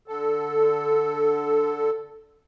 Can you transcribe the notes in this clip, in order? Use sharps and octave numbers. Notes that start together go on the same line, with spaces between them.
D3 A4